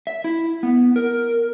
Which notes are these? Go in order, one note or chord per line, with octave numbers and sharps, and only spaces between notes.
E5
E4
B3
A#4